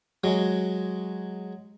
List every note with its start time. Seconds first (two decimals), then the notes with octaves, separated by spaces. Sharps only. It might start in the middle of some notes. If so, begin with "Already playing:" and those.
0.24 F#3 G#3